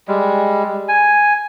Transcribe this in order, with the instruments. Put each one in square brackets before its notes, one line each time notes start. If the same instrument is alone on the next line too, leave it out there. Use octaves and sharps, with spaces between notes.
[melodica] G3 G#3
G#5